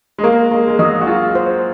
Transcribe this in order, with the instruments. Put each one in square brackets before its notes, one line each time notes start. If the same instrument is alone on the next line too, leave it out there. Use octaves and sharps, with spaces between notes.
[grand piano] G#3
[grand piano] A#3 [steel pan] A#4
[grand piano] G#3 [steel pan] A#4
[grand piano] G#3
[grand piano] F#3 [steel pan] D#5
[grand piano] F#4
[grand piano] F4 [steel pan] G#4
[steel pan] C5